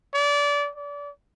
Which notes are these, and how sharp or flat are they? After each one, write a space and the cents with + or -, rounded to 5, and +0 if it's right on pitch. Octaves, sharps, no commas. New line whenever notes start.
D5 -25
D5 -30